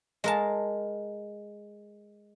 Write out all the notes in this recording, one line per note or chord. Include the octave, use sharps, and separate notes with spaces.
G#3 A#4 A5